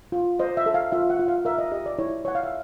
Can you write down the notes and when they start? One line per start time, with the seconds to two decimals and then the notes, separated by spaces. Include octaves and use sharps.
0.12 F4
0.39 C5 D#5
0.57 E5
0.66 A4
0.74 F5
0.92 F4 E5
1.10 F#5
1.19 F4
1.28 F5
1.45 A#4 E5
1.58 D#5
1.72 G4 D#5
1.86 D5
1.99 E4 C#5
2.25 C#5 F#5
2.35 F5
2.44 E5